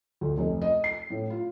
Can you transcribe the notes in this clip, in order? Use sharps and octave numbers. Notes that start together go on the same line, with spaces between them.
D2
F1
D#5
C7
A2
F4